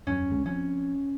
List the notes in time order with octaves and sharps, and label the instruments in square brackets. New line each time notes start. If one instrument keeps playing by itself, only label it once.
[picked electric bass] E1 F#2 F#3 [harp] C#4
[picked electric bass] C2 D3 G#3
[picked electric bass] F3 C4 [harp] C#4